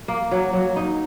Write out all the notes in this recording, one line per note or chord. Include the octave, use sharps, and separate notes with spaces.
A#3
F#3
F#3
D#4